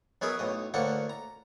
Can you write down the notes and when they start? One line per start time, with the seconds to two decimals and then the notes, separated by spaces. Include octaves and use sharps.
0.22 F#3 B3 D#4 G#4 A#4 E5
0.39 B1 A2 D#5
0.74 D2 A2 A#3 A4 F#5 C#6
1.10 A#5